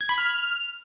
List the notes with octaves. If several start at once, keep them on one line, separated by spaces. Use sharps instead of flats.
G#6
B5
F6